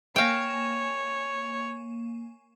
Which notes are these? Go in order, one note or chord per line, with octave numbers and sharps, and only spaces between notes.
A#3 C#5 F5 G5 G#5 E7